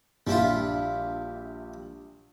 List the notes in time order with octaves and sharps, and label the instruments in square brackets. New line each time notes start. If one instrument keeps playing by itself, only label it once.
[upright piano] A#1 D4 [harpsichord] G3 E4 F4